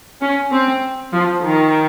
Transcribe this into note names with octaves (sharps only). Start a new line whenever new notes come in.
C#4
C4
F3
D#3